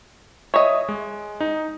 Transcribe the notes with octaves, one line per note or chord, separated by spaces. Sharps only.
C#5 D#5 E5 D#6
G#3
D#4